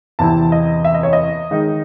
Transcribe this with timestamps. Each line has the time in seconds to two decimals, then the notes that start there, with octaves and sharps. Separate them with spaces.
0.19 E2 C3 E3 C4 E4 A5
0.52 D#5
0.84 E5
0.94 D#5
1.03 C#5
1.13 D#5
1.51 D#3 G#3 D#4